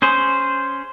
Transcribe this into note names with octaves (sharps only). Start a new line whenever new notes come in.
C#4 G#4 C5